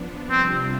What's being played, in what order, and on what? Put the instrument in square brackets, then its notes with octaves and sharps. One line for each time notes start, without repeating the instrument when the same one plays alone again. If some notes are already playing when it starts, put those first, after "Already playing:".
Already playing: [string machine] F3 B3 D4
[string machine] C3 G3 D4 F4 [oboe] C4